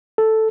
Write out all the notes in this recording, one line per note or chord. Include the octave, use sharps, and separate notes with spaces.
A4